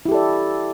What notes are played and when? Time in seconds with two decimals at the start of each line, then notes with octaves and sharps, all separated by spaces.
0.06 E4
0.08 G4
0.11 A4
0.14 D5